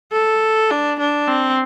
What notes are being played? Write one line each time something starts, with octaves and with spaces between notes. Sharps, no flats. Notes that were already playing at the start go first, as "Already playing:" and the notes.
A4
D4
D4
C4